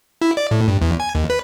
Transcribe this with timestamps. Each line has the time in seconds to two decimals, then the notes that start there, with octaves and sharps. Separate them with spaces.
0.22 E4
0.37 D5
0.51 A2
0.68 G2
0.81 E2
1.00 G#5
1.15 D#2
1.30 B4